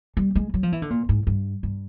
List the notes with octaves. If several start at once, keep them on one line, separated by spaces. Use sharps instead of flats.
G3
G#3
F#3
F3
E3
D3
A#2
G#2
G2
G2